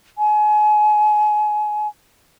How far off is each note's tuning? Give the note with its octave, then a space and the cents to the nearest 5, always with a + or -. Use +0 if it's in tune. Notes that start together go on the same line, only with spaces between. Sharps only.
G#5 +30